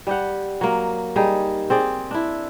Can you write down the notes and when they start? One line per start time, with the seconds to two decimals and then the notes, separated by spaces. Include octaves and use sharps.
0.07 G3 G4 F#5
0.61 F#3 A#3
1.16 G3 D#4 G#4
1.70 C4 G#4 D5
2.11 D4 E4